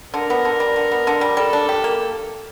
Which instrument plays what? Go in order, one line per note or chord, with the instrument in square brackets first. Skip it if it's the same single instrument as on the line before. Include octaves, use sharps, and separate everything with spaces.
[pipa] D3 [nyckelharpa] A#4
[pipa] B3
D3
G3
D3
B3
D3
G3
[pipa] G3 [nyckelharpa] A4
[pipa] D4
G4
A#3